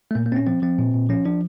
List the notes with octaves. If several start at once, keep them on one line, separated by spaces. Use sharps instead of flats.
A3
A#2 A#3
A#3
A#2 C4
C#4
F3 C4
F3 C4
A#2
A#2
F3 C#4
F3 D4